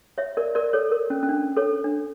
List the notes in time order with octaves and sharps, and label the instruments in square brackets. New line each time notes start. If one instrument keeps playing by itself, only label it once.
[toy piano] C#5 E5
A#4 D5
A#4 D5
A4 C#5
A#4
C#4
C#4
D4
A4 C#5
D4